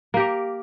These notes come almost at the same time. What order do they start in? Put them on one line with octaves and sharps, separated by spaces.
A#3 G4 A#4